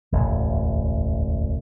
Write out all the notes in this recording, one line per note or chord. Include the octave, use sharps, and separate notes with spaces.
E1 A1 D2